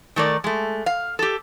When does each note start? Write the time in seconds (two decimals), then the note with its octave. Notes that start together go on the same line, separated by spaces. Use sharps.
0.16 D#3 A3 A#4 D5
0.44 G#3 A3
0.86 F5
1.19 G4 A4